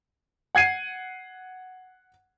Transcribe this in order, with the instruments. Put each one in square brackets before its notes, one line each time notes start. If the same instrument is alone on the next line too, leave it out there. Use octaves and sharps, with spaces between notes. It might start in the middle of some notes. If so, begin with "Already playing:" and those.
[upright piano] F#5 G#6 C7 D#7